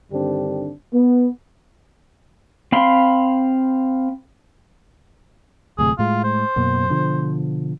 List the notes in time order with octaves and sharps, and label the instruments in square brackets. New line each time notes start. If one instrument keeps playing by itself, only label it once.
[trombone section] G2 D3 D#3 C4 D4 G4
B3
[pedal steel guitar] C4 F5 B5 C6
[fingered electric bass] D1 A2 C3 [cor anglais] G#4
[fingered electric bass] A2 G#3 [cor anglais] F4
[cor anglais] C5
[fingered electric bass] F#2 B2 A#3
B2 D3 F3